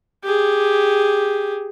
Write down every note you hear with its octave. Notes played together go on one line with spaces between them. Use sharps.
G4 G#4